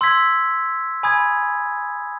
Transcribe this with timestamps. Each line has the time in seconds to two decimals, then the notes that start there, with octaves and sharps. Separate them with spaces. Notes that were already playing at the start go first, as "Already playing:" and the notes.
0.01 C6 E6 G#6 B6
1.03 G#5 B5 D#6 G#6